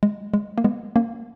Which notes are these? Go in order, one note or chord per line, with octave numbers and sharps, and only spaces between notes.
G#3
G#3
A#3
G#3 B3
A#3 C#4